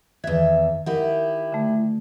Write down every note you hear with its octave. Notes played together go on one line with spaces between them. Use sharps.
E2 D#3 E5 G#6
D#4 E4 G4 A#4 F#5
D3 A3